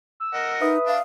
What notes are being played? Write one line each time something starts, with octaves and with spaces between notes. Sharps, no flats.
E6
A#4 D#5 F#5
D#4 B4 E5 D#6
D4 D5 F5